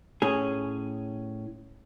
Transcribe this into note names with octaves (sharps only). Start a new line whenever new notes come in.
A2 C#4 G#4